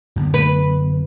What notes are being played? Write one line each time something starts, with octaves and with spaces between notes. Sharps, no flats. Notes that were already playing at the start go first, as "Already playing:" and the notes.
F#2 D3 B3
B4